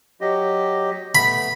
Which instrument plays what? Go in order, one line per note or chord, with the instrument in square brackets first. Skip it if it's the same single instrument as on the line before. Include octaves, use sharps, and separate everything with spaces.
[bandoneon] F#3 G4 D#5
[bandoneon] A3 B3 [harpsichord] B5